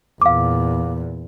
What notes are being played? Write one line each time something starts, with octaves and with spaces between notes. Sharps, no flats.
E2 A#2 F5 D6